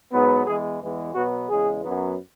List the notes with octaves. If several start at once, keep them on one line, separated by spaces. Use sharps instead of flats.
G#2 F#3 B3
E2 E3 G#3 B3 G#4
E2 E3 G#3 B3
B2 F#3 B3 F#4
E2 C#3 G#3 G#4
F#2 F#3 B3